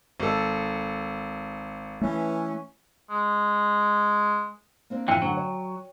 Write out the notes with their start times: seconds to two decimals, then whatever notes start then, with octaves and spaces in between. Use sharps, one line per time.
0.20 G#1 A4
2.01 E3 A3 C#4
3.10 G#3
4.90 A#3 C4 D4
5.08 A2 D3 E3 F3 G5 D#7
5.22 D3 F#3 A3 D#4 C5 F#5
5.37 C#5 D5